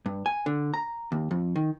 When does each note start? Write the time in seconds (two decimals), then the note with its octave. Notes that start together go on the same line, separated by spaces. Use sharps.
0.06 G2
0.26 G#5
0.46 D3
0.74 A#5
1.12 D#2
1.31 F2
1.56 D#3